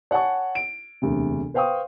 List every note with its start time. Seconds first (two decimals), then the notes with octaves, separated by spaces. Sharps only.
0.11 C#5 F#5 G#5 A5 C#6
0.55 D7
1.02 E1 D2 C3
1.54 B4 C5 F5 G5 C#6 D#6